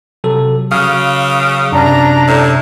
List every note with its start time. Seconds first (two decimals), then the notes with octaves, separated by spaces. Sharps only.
0.24 C3 F#3 A4
0.71 C#3 F#3 F5 F6
1.72 F#2 C3 D4 A#5
2.28 A2